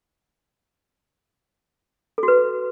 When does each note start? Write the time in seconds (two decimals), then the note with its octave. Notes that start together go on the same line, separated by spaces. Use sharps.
2.18 A4
2.23 F#4
2.28 B4